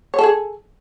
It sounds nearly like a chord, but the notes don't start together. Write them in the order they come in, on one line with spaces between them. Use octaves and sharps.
C#5 A4 G#4